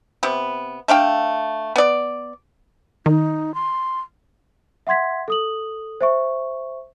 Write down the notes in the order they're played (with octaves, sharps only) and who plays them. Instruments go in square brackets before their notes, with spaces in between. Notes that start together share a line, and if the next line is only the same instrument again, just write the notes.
[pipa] C3 B3
A3 D4 F5 G5
B3 D5
[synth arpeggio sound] D#3 [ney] D#4
[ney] C6
[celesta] E5 F#5 C6 G#6 B6
A4 D#6 F#7
C5 E5 C#6